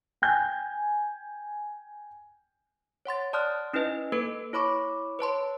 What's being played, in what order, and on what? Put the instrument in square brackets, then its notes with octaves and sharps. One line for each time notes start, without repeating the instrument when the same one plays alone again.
[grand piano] G5 G#5 G6
[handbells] C#5 F#5 C6 A6
D5 A5 C6 D#6 F6 F#6
C#4 D#4 E4 B4 D#5
A#3 A4 B4 D7
E4 C#5 B5 C#6 D6
B4 C#5 A5 C6